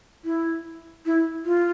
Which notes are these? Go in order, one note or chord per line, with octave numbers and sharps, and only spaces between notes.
E4
E4
F4